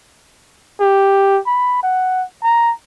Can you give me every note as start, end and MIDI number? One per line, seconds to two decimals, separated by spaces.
0.80 1.39 67
1.47 1.80 83
1.83 2.24 78
2.43 2.72 82